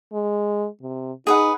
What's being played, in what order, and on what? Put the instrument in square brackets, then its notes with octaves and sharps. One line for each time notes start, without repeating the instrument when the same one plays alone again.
[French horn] G#3
C3
[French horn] D#4 [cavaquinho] G#4 B4 F#5